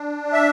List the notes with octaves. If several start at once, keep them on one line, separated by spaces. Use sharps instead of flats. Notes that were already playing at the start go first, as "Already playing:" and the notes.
Already playing: D4
E5